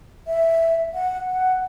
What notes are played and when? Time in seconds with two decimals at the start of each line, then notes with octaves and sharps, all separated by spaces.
0.27 E5
0.94 F#5
1.28 F#5